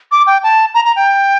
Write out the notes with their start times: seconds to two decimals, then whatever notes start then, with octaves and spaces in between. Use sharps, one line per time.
0.12 D6
0.27 G5
0.43 A5
0.74 A#5
0.85 A#5
0.96 G5